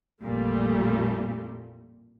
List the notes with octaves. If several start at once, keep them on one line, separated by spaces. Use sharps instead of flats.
A1 F2 A#2 G3 A3